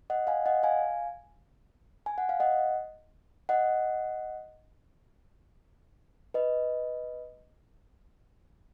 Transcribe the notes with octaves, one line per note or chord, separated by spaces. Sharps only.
D#5 F#5
F5 G#5
D#5 F#5
F5 G#5
G#5
F#5
F5
D#5 F#5
D#5 F#5
B4 D#5